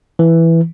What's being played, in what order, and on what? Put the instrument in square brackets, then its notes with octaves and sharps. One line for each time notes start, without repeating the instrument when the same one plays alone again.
[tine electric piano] E3